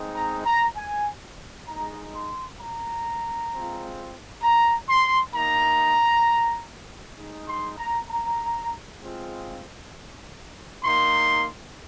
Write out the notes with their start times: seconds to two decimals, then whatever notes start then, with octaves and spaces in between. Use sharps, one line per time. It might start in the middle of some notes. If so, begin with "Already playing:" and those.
Already playing: G#3 C4 D#4
0.16 A#5
0.46 A#5
0.76 G#5
1.68 G#3 D#4 A#5
2.15 C6
2.60 A#5
3.51 G#3 C4 F4
4.43 A#5
4.89 C6
5.34 A#3 D#4 A#5
7.17 G#3 D#4
7.48 C6
7.78 A#5
8.09 A#5
9.02 G#3 C4 F4
10.84 A#3 D#4 C6